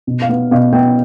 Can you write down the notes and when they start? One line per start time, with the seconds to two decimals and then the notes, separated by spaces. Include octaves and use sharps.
0.07 B2
0.22 F5
0.29 B3
0.51 B2 F5
0.73 B3 G5